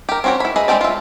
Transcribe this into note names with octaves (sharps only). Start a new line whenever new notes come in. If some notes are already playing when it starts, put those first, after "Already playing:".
G4 A#4
C4 C#4 F#4 G4 C#5
E4 B5
G#4 B4 D#5 E5
G#3 A3 C4 G4 D5
F4 E5